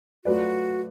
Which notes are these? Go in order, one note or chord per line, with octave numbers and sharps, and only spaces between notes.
F#3 A3 F4 F#4 B4 D5